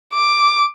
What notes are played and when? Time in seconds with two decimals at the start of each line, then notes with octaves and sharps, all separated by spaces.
0.13 D6